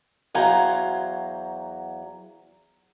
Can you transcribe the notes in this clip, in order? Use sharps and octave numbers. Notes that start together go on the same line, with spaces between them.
E2 F#3 C5 F5 G#5 A#5